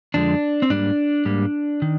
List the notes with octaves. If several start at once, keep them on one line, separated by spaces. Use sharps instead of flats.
F2 D3 F3 G#3 D4
C4
G#2 G3 A#3 D4
G#2 G3 A#3
D#3